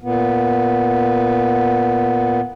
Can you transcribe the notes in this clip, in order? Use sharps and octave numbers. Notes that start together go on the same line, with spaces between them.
A#2 B3